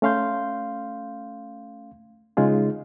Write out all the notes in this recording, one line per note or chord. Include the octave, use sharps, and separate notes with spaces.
A3 C#4 F5 C6 G6
C#3 G#3 D#4 F4 G#4